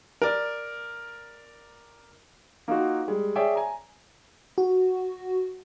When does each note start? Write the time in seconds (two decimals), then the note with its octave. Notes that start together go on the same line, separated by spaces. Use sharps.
0.22 A#4 D5
2.68 A#3 D#4 F4 F#4
3.08 G3 G#3
3.36 G#4 C#5 D5 E5 G5 G#5
3.55 G#5 A#5
4.58 F#4